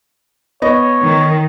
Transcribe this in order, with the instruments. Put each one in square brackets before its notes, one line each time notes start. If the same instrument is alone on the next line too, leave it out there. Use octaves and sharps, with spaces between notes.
[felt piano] B3 D#5 [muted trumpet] C#5
[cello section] D#3